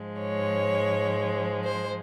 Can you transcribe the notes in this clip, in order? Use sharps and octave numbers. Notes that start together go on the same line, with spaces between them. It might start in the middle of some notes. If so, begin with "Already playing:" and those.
Already playing: G#2 F3 G#3
C#5
C5